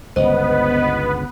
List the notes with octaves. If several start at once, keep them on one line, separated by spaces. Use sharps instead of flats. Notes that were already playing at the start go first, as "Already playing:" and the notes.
G1 C#2 B3 B4 C5 D#5